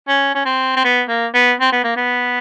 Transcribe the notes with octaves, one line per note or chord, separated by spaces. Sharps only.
C#4
C#4
C4
C4
B3
A#3
B3
C4
B3
A#3
B3